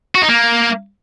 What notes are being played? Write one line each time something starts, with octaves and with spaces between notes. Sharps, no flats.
F#4
D#4
A#3